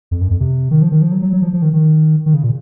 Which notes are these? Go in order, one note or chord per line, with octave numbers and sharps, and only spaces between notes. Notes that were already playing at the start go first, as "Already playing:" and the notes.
F2
F#2
F2
C3
D#3
F3
D#3
F3
F#3
F#3
F#3
F3
F3
D#3
D#3
D#3
C#3
A#2